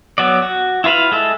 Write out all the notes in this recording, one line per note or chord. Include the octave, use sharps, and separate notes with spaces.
F#3 B3 D5
F#4
E4 F4 B4 F5 B5
G#3 A4 E5